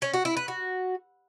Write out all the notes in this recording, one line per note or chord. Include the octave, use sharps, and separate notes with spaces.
C#4
F#4
E4
B4
F#4